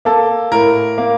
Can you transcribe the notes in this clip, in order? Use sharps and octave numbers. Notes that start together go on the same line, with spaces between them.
A#3 A4
A2 A#4
A#3